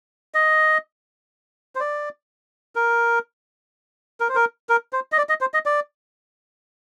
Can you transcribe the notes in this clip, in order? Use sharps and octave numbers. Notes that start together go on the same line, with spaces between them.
D#5
C5
D5
A#4
A#4
C5
A#4
A#4
C5
D#5
D5
D#5
C5
D#5
D5